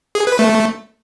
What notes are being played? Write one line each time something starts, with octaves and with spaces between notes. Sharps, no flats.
G#4
B4
A3